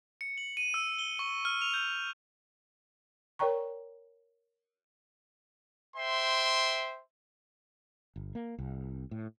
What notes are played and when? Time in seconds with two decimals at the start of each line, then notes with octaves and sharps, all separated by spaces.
0.21 C#7
0.38 F#7
0.57 D#7
0.74 E6
0.99 G7
1.19 C#6
1.45 F6
1.61 F7
1.74 G6
3.39 A#4 C#5 D5 G5 A#5 C#6
5.97 C5 E5 G5 C6
8.16 G1
8.35 A#3
8.58 C2
9.11 A2